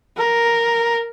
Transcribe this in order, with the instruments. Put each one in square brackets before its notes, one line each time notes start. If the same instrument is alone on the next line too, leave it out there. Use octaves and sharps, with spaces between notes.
[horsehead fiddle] A#4